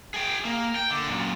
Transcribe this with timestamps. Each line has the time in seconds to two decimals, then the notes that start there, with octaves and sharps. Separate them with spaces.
0.14 G#4 G5
0.45 A#3
0.75 G5
0.91 D3
1.07 F#2 A#2